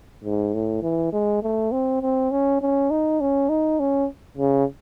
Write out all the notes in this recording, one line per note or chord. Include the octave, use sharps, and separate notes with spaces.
G#2
A2
E3
G#3
A3
C4
C4
C#4
C#4
D#4
C#4
D#4
C#4
C#3